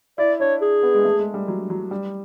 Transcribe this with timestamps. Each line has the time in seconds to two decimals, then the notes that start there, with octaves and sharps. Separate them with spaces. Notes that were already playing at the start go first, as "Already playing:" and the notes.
0.18 E4 D5
0.40 D4 C#5
0.62 G#4
0.83 B3
0.94 G#3
1.05 A3
1.19 G#3
1.34 G3
1.48 F#3
1.70 F#3
1.91 G3